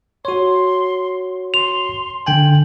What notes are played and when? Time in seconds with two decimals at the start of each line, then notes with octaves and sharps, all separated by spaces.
0.25 F#4 C#5 C6
1.54 C6 F7
2.27 D3 G5 G#5 F#7